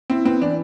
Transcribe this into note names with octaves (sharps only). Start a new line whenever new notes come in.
C4 E4
B3 C4
E3 D4